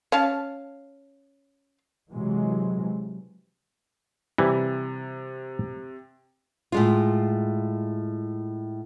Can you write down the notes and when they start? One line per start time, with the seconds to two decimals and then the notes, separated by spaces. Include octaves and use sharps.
0.12 C#4 F5 A5
2.11 C3 E3 F#3 G#3
4.38 C3 E3 G3
6.72 A2 G#3 F4